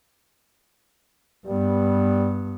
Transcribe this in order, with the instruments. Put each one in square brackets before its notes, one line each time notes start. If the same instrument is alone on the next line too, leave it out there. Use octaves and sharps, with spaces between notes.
[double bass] G2 B3 [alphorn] G3